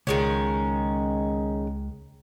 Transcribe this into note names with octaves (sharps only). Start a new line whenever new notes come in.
C#2 D#3 G#3 C#4